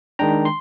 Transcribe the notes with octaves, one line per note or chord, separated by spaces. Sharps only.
D#3 G#3 D4 G5 A#5
C6